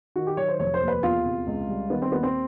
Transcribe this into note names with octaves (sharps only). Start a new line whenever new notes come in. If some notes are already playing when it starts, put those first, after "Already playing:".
D#3 F#4
G4
F#3 C#5
C5
F1 C#5
C5
D#2
B4
E2 F4
C3
C#2
G3
D#3 B3
C4
D#2 B3
C4